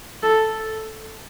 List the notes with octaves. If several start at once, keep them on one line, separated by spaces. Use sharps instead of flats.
A4